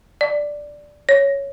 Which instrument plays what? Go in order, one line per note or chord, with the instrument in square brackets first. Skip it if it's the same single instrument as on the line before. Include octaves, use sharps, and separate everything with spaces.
[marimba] D5
C#5